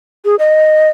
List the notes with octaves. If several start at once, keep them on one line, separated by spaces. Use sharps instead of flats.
G#4
D#5